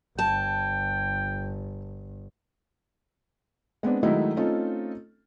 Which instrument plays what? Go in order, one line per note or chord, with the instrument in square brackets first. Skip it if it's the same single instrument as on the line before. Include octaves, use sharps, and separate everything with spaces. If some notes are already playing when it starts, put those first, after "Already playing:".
[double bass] G1 [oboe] G5 [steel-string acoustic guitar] A5
[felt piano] G#3 B3 C4 D4
D#3 F#3 G#3 A3 D#4 E4
A3 C4 C#4 D#4 F4 A4